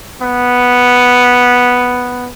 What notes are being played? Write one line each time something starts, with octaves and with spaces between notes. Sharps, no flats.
B3